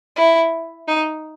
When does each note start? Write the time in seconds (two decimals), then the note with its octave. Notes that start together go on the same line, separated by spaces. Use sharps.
0.16 E4
0.88 D#4